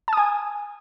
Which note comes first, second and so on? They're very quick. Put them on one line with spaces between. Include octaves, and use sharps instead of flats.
A5 D#6 G#5